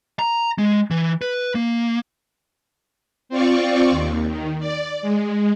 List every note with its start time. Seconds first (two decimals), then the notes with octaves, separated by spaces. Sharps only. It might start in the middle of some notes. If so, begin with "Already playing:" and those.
0.19 A#5
0.58 G#3
0.91 E3
1.21 B4
1.55 A#3
3.29 C4 F4 D5 C#6
3.90 D#2
4.27 D#3
4.60 D5
5.02 G#3